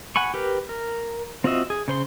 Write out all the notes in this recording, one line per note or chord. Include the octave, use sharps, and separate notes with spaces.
F#5 G#5 B5 C#6
G4 A#4 B4
A#4
C4 F4 F#4 D#5 E5
G#4
C#3 C5 C6